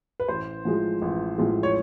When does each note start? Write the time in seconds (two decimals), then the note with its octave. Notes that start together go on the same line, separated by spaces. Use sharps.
0.20 B4
0.28 A1 C5
0.65 A2 F3 G#3
1.02 A1
1.38 A2 F3 G#3
1.63 C#5